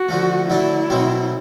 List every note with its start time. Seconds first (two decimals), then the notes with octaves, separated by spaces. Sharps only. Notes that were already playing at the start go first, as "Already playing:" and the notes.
Already playing: F#4
0.09 D3 F3 A3
0.49 D3 F#3 A3 D4 E4
0.90 B2 F#3 A3 C4